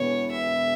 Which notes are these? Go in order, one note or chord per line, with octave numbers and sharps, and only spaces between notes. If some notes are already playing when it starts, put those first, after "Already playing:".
Already playing: E1 E2 B2 B3 C#5
E5